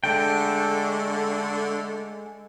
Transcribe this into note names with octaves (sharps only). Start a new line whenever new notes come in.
D3 G#3 A3 A4 G5